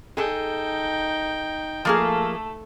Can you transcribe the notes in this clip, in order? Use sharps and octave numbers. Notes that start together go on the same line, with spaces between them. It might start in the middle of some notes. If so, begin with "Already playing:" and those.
D#4 G#4 A4 G5
F3 A3 A#3 G#4 A4